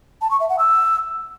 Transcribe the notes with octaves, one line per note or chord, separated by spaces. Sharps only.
A5
C#6
E5
F#5
E6